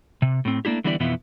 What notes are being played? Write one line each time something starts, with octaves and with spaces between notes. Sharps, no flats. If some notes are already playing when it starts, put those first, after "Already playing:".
C3
A2 C4
A3 A#3 D4 E4 G4
D3 E3 G3 B3 E4 D5
F2 B2 E3 F3 B3 E4